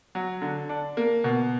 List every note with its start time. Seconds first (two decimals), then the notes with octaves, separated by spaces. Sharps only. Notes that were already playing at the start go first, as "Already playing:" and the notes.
0.15 F#3
0.42 D3
0.69 D4
0.97 A#3
1.24 B2